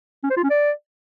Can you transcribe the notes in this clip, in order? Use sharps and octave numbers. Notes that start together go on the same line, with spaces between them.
C#4
C5
F4
C#4
D5